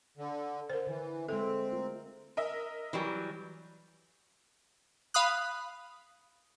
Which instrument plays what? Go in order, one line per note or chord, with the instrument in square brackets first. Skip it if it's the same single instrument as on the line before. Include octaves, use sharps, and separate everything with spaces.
[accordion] D3
[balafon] A#4 C5
[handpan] D3 [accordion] E3
[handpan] G#3 E5 [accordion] C4 [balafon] A4
[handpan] A3 F4 A#4
[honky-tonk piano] A#4 D#5 E5
[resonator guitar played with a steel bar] E3 F#3 G3
[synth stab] F5 B5 D#6 F#6